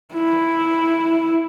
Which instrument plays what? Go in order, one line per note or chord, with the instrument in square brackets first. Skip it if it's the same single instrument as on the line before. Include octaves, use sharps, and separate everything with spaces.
[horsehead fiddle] E4